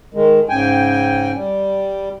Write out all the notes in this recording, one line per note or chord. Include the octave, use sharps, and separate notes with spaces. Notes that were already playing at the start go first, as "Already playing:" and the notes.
D#3 G#3
G#2 C#3 G5 G#5
G3